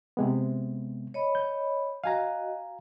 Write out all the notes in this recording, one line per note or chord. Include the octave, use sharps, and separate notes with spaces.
C3 G#3 B3
C#5 D#5 B5
G6
F#4 D#5 F5 G#5 A#5